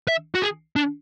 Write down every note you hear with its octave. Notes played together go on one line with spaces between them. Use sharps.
E5
F#4
G#4
D4